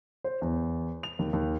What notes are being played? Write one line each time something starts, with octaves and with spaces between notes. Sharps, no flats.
C5
E2
F7
D#2
D#2